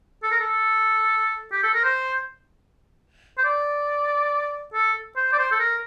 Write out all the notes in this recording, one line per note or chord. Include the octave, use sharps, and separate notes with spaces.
A4
A#4
A4
G4
A4
A#4
C5
C5
D5
A4
C5
D5
C5
A4
A#4